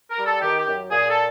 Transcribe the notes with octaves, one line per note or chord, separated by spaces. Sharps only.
A#4
G3
A4
D#3 G4
G4
F#2
A#2 G#4
A4